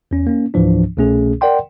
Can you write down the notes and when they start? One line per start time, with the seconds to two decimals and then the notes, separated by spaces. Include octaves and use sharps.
0.11 E2 C#4
0.27 A#3 C#4
0.54 C#2 G#2 E3 F3 D4
0.97 C2 B2 A3 C#4 G#4
1.41 A#4 D5 F#5 G5 C6